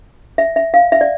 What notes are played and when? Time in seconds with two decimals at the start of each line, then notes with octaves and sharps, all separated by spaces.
0.38 E5
0.56 E5
0.74 F5
0.92 E5
1.01 D5